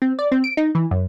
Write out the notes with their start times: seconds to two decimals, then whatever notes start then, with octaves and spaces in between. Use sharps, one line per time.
0.02 C4
0.19 D5
0.32 C4
0.44 D7
0.57 D#4
0.75 E3
0.91 F#2